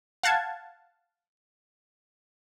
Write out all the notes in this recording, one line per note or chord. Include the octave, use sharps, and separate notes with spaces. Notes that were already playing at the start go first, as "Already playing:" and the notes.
F5 F#5 A5 G#6